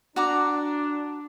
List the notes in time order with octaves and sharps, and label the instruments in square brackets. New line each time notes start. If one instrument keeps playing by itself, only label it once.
[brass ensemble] D4 [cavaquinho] F#4 A#5 D6